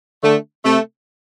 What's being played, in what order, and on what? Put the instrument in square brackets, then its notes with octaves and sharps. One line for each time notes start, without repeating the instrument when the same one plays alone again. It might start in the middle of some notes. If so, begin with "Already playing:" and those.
[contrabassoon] D3 [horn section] A3
[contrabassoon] C3 [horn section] A3